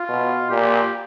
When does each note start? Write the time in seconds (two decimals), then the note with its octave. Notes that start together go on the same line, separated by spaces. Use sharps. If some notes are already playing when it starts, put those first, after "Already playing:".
Already playing: F4
0.09 B2
0.50 A#2 G4